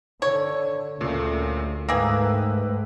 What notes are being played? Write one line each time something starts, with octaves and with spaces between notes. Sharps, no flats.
D3 C#5
D2 A#2 C#3 A3
G#2 A3 A#3 G#4 B4 G5 E6